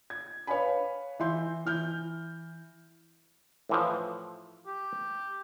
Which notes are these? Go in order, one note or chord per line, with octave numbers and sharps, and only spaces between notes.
G#6
B4 C#5 F5 G#5 B5
E3 E5 C6 G6
E3 F6 G6
A2 E3 F3
G4